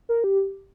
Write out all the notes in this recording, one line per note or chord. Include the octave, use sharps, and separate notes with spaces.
A#4
G4